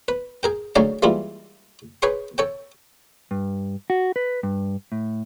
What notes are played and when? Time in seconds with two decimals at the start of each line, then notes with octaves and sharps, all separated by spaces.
0.08 B4
0.43 G#4 A#4 G5
0.76 D2 F#3 D#4 G#4 D5 F5
1.03 E3 G3 G#3 A#3 E4 F4
2.02 G#4 B4 C#5 G5 C6
2.38 A4 C#5 G5
3.31 G2
3.90 F#4
4.16 B4
4.43 G2
4.92 A2